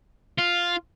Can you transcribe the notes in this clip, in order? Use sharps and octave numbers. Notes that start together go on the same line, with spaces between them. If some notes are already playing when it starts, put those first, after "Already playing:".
F4